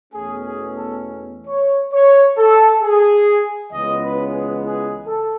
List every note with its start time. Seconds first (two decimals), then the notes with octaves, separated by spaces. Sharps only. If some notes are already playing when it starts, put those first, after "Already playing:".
0.13 E2 B2 A3 C#4 G#4
0.43 G#4
0.73 A4
1.48 C#5
1.93 C#5
2.38 A4
2.82 G#4
3.72 C#2 C#3 E3 G#3 B3 D#5
4.02 B4
4.32 G#4
4.62 G#4
5.07 A4